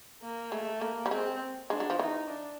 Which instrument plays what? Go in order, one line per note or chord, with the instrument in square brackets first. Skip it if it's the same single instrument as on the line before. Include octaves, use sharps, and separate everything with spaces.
[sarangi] A#3
[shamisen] G#3 [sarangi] A3
[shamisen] A3 [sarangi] A#3
[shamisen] G3
[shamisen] G#3 [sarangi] C4
[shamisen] G#3 [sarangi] D4
[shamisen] F#3
F3
[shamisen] E3 [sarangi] D#4
[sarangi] D4